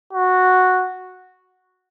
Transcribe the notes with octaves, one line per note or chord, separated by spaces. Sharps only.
F#4